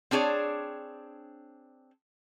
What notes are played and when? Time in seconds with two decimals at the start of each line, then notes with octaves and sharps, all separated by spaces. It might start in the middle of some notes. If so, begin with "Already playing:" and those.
0.11 C4 D4 G#4 C#5 D5